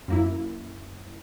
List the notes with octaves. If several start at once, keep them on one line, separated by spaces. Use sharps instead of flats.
F#2 A#3 E4